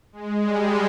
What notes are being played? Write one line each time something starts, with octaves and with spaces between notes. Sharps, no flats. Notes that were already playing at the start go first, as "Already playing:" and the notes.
G#3
G3